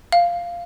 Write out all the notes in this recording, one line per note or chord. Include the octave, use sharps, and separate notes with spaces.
F5